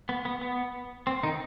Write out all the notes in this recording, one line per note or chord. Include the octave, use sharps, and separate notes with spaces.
B3
B3
B3
C4
D#3 D#4